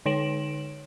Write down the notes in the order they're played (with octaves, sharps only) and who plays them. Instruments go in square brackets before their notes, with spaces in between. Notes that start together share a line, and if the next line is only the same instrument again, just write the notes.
[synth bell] D3 D#4 C#5 D7 E7 F#7